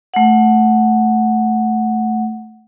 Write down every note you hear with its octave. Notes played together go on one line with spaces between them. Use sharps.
A3 F#5